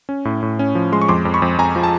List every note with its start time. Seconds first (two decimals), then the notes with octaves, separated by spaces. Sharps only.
0.09 C#4
0.25 A2
0.43 A2
0.59 C#4
0.75 F3
0.92 G#3 C6
1.02 C#6
1.08 F2 C6 D6
1.25 F2
1.34 B5 C#6
1.42 F2
1.58 F2 G#5 A#5
1.76 F3
1.83 A5